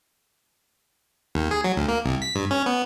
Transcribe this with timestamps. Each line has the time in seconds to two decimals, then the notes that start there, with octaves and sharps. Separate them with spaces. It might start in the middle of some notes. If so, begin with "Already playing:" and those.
1.35 D#2
1.51 G#4
1.64 F#3
1.76 D2
1.89 A#3
2.04 C2
2.22 B6
2.35 G2
2.51 C#4
2.66 B3